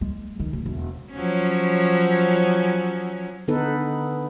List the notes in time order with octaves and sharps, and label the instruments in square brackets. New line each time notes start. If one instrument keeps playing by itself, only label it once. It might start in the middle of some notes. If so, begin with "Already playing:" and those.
[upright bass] G#3
D#3
D1
E1
[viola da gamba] F3 F#3 C#4
[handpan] D3 B3 D#4 A4 B4